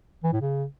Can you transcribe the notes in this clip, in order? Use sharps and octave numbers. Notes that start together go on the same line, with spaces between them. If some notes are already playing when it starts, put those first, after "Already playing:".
E3
A2
C#3